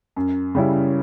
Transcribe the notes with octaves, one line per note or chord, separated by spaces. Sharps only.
F#2
C#3 G3 C#4 E4